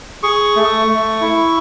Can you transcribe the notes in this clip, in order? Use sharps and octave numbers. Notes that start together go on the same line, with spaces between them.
G#4 C#6
A3
A3
E4